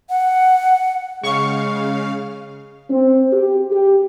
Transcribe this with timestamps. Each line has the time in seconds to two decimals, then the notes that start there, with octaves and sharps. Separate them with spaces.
0.10 F#5
1.23 C#3 G#3 F5 C#6
2.90 C4
3.33 G4
3.71 G4